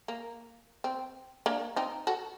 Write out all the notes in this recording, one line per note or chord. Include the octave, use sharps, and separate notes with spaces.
A#3
C4
A#3 D4
C4 D#4
F#4 A4